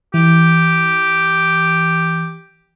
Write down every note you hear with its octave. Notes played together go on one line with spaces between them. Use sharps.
E3 G4